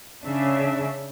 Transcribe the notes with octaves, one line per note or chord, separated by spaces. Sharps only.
C#3 C#4 D4 E5